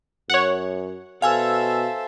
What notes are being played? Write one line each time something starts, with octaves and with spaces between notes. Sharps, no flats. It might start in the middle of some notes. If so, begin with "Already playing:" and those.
F#2 C#5 F#5
B2 A4 C5 E5 F5 G#5 E6